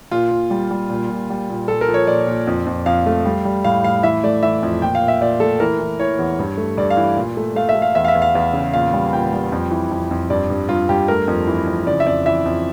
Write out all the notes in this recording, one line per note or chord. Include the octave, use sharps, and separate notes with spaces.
A#2 F4
A#2
G3
G3
A#2
A#2
G3
A#2
A#2 A4
A#4
F3
C#5
A#2 D5
A#2
F2
F2
F2 F5
A3
G3
G3
A2 F5
A2 F5
E3 E5
A3 D5
E3 E5
F2
A#2 G5
F5
A#2
E5
A#2 D5
A3 A4
E3 A#4
E3
E3 C#5
E2
G2
A3
G2 D5
F5
E3
A#2
A3
A3 F5
E5
A3
F5
E2 E5
F5
E5
E2
F5
E2
C#3
A#2 F5
G3
A#2 G5
G3
F2
E3
F2
F2
G2 D5
G2
G2 F4
G2 G4
A3 A#4
F2
E3
F2
C#3 D5
E5
F2 D5
E3 E5
F2